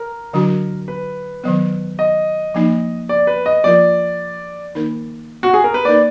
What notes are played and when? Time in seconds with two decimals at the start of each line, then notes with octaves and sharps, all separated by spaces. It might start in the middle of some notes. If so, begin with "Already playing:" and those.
Already playing: A#4
0.33 D3 F#3 D4 F#4
0.88 B4
1.44 D#3 F#3 B3
1.99 D#5
2.54 F3 A#3 D#4
3.09 D5
3.27 B4
3.46 D#5
3.64 F3 A#3 F4 A#4 D5
4.75 D#3 A#3 D#4 A#4
5.43 F#4
5.54 G#4
5.64 A#4
5.74 B4
5.85 A#3 D#4 A#4 D5